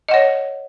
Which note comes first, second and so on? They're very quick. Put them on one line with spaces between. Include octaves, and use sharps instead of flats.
D#5 F#5 C#5